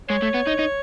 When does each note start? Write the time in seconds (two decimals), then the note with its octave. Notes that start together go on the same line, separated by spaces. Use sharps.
0.10 G#3 C#5
0.22 A3
0.34 B3
0.47 D#4
0.59 D#4